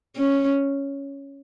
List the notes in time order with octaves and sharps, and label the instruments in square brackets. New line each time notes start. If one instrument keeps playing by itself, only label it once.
[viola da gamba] C#4